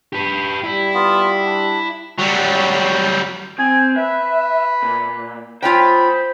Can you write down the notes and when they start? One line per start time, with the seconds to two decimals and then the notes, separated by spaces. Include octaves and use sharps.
0.13 G4 B4
0.64 G3 E4
0.94 B3 F4
1.46 D4
2.19 F#3 G3
3.59 C4 G#5
3.96 B4 E5
4.82 A#2
5.62 F4 C5 C#5 G5 G#5 B5